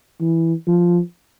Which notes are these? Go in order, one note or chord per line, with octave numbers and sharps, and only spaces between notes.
E3
F3